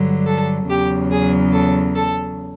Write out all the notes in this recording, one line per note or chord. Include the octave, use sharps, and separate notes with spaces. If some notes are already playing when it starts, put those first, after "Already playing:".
Already playing: G2 D3 F#3
A4
E2 C#3 F#3 G4
G#4
A4
A4